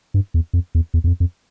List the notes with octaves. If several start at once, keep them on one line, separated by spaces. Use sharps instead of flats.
G2
E2
F2
E2
E2
E2
F2
F2